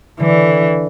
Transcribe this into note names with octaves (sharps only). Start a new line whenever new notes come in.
D3 E3